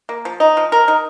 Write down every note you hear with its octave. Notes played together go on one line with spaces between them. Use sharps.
A#3
F3
D#4
F3
A#4
D#4